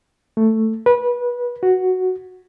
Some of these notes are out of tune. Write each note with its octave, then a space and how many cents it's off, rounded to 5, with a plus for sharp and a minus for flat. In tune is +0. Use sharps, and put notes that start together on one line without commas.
A3 +5
B4 -25
F#4 +0